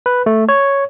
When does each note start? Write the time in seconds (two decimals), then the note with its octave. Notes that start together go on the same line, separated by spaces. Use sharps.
0.06 B4
0.26 A3
0.49 C#5